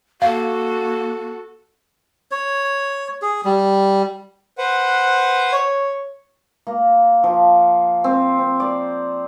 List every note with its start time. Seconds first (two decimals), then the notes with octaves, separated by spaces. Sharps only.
0.22 A#3 F#4 A4 F5
2.31 C#5
3.22 G#4
3.45 G3
4.58 B4 C5 F#5
5.53 C#5
6.67 A#3
7.23 F3
8.04 C4
8.39 C4
8.60 D5